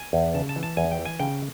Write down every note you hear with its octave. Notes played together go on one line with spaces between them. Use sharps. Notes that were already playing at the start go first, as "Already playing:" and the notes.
Already playing: G#5
E2
C#3 A5
A5
E3
A5
E2 G#5
G5
E3
G#5
C#3 G5